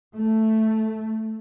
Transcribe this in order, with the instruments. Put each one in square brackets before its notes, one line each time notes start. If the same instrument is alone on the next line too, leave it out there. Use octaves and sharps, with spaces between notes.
[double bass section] A3